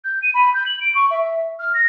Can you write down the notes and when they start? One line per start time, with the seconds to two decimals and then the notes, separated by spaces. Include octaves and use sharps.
0.04 G6
0.22 D#7
0.34 B5
0.54 G6
0.66 F#7
0.81 D7
0.95 C#6
1.11 E5
1.59 F6
1.74 A#6